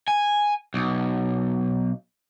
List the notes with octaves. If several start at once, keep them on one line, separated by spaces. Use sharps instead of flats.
G#5
B1